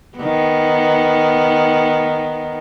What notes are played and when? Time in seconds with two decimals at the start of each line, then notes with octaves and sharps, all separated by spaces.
0.18 D#3 B3